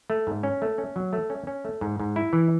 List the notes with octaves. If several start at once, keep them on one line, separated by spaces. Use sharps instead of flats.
A3
G#2
C#4
A3
C#4
F#3
A3
C#4
C#4
A3
G#2
G#2
E4
E3